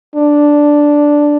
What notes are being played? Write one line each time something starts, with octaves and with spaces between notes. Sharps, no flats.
D4